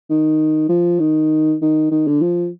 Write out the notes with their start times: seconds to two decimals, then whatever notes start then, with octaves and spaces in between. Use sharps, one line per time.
0.09 D#3
0.69 F3
1.00 D#3
1.61 D#3
1.91 D#3
2.07 D3
2.21 F3